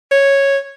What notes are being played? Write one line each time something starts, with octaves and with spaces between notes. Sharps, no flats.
C#5